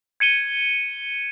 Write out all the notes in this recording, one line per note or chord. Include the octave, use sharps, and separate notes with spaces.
G#6 C#7 D#7 G7